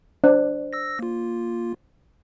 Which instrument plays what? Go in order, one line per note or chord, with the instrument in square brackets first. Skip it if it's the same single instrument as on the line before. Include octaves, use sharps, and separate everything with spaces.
[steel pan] D4 [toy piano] C5
[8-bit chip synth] E6 A#6
A#3 F4